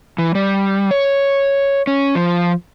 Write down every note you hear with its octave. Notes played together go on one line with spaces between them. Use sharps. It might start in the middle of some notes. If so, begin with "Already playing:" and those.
E3
G3
C#5
C#4
F3